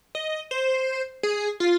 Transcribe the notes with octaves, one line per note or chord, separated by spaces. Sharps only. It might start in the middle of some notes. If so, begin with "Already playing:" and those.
D#5
C5
G#4
F4